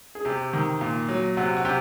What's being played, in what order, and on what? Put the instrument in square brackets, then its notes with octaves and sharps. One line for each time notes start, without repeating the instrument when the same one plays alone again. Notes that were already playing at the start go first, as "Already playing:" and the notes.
[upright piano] G#4
C3 G4
D#3
A#2
F#3
C3 F#4
F#4
C3 G4